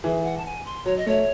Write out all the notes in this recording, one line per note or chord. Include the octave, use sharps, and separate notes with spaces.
E3 G#4
F#5
A5
G#5
C6
F#3 C#5
D#5
A3 C#5